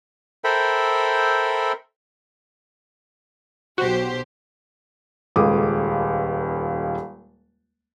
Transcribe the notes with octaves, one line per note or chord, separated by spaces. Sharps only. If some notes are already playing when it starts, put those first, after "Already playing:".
A4 A#4 C5 E5 G5 B5
B1 F#4 G4 C5
D#1 C#2 G#3 A4 D6 D#6